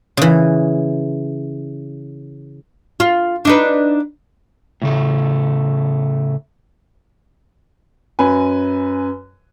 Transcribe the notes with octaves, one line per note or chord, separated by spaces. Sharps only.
C#3 E3
F4
D4 D#4 B4
A2 C#3 A3
F#2 C#4 B4 G#5